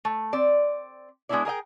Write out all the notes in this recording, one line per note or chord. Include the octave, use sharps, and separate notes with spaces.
A3
C4 D5
G#3 B3 C#4 D4 E4 D5
G#4 A#4 D#5 G5